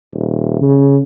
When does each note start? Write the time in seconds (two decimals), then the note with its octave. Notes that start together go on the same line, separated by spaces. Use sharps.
0.13 D#1
0.61 C#3